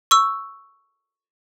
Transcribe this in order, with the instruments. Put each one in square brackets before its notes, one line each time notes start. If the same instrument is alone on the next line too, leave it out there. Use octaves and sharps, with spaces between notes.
[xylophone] C#6 E6